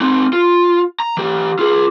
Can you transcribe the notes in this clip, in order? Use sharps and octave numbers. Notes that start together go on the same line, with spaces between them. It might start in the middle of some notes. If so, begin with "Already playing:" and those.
C4 D#4
F4
A#5
E3 G4
F4 G#4